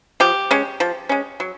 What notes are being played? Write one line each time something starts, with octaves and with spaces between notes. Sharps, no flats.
F3 G4
G#3 C#4
F3
G#3 C#4
F#3